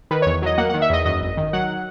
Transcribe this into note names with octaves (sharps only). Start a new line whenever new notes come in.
D#3 B4
E2 C#5
F#3 D#5
A#3 F#5
D#3 F#5
E5
E2 D#5
F#2 D#5
G#1
D#3
F#3 F#5